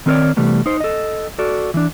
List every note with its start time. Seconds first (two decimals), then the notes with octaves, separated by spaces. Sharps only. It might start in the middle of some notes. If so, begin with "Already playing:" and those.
0.06 D#3 C4 A#4 B4 C#5 D5
0.37 C3 E3 G3 A3 B3
0.66 D#4 C5
0.80 A4 D#5
1.39 F#4 A4 D5
1.74 E3 D4